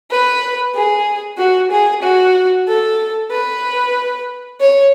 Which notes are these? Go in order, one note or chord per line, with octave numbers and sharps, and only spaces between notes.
B4
G#4
F#4
G#4
F#4
A4
B4
C#5